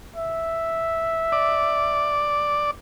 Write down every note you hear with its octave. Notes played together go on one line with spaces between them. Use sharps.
E5
D5